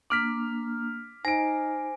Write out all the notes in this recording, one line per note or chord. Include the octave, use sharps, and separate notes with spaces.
A#3 D4 D6 F6 B6
D#4 C5 G#5 A#6 D7